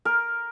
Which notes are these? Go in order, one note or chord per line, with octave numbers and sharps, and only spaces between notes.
A#4